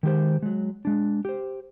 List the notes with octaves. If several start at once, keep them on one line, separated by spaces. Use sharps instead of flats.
D#3 G#3 G4 C5
F#3 G#3
G#3 D4
G4 C5